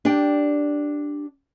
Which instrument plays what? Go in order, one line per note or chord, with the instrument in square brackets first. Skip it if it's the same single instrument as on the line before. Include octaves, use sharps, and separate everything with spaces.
[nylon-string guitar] D4 G4 D5 G5